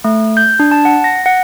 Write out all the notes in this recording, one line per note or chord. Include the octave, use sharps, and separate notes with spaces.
A3
G6
D4
A5
F#5
A#6
F#5